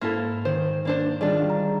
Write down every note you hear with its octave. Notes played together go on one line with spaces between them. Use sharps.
G#2 A#3 E4 A4 F5
D#3 G#4 C5
A#3 D4 C5
D#3 G3 D4 F4 G#4 D5 D#5
A#5